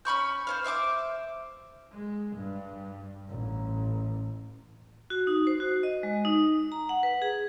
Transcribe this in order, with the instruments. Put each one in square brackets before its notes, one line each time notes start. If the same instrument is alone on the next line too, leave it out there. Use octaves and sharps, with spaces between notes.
[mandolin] C#4 B5 C#6 G6
C5 C#5 F5
C5 E5 C#6 D6
[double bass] G#3
G2
A1
[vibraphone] F#4
D#4
C5
F#4
D#5
G#3
D#4
A#5
F#5
B4
G#4